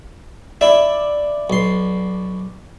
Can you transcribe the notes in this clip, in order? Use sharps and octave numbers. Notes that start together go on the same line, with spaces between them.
E4 D5 E5
B1 C6